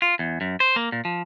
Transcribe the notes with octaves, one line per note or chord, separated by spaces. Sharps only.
F4
E2
F#2
C5
A#3
A#2
F3